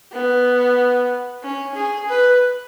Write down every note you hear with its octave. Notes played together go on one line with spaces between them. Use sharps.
B3
C#4
G#4
B4